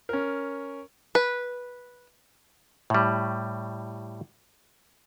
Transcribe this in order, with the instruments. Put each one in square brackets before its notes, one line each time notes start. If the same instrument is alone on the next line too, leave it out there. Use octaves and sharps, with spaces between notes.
[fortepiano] C#4 A#4
[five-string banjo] B4
[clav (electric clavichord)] A2 G3